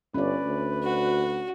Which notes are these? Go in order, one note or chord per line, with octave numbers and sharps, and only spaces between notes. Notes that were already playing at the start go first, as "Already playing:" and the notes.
G1 C#4 B4 D5
D2
F#4